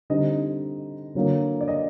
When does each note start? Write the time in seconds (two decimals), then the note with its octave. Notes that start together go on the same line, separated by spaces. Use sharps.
0.10 D3 G3 C4 D#4 D#5
1.15 D3 F#3 A#3
1.61 D5
1.68 D#5